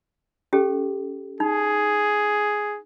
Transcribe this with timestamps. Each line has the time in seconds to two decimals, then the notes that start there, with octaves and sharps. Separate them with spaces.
0.53 C#4 G4 A4
1.40 D#4 G#4